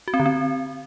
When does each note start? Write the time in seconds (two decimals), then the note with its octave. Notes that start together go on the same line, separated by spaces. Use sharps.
0.08 F#4
0.14 C4
0.20 D3
0.26 C4